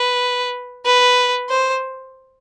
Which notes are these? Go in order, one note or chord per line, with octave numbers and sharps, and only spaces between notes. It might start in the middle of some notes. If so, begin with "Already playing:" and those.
Already playing: B4
B4
C5